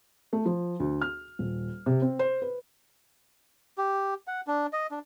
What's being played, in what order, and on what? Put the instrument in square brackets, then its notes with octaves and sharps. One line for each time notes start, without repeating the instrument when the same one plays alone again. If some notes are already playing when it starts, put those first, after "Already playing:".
[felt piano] A3
F3
D2
F6
D#1
C3
C4
C5
B4
[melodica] G4
F#5
D4
D#5
D4